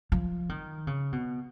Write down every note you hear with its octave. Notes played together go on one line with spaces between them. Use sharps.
F3
D#3
C#3
B2